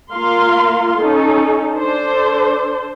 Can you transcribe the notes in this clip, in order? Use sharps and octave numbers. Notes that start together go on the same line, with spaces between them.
A#3 F4 A#4 F5 C6
C#4 D#4 A4
D4 A4 C5